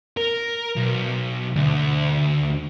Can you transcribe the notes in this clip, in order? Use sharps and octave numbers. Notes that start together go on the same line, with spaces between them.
A#4
B1
D2